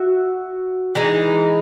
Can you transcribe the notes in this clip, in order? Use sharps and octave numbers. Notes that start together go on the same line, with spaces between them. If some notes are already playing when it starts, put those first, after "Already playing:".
Already playing: F#4 E5
E3 G#3 D#4